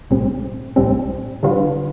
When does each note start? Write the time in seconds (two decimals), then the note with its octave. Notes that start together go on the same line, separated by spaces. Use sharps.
0.10 B1 A2 G3 C4
0.76 B1 A2 G3 C4
1.43 D3 G3 D4 F4 B4